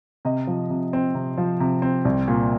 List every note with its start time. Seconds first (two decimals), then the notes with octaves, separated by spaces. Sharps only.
0.25 C3 D#5
0.47 F3
0.70 C3
0.93 C4
1.15 C3
1.37 F3
1.60 C3
1.82 C4
2.05 C2
2.28 A#2